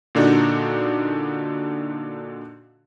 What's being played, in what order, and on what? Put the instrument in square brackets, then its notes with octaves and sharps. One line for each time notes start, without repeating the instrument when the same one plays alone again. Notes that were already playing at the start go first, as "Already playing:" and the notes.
[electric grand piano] A#2 D3 D4 D#4 F#4